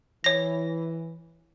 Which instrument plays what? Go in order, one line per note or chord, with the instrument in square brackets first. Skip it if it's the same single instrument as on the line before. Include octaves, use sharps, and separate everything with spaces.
[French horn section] E3 [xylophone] C#5 A#6